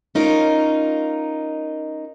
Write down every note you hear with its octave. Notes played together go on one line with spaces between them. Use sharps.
C#4 D#4 F4 A#4